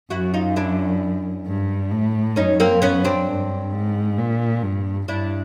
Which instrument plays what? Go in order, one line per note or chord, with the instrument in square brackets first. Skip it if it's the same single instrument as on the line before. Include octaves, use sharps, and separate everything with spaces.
[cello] F#2 [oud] E4 F#4
[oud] D#4 F4
D4 E4
[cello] G2
A2
[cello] F#2 [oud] C#4 D#4
[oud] A#3 C4
B3 C#4
C4 D4
[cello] G2
G#2
A#2
G2
[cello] G2 [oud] D4 E4